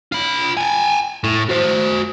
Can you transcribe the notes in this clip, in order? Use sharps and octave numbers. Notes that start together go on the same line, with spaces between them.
F4 B5
G5 G#5
A2
F#4 C5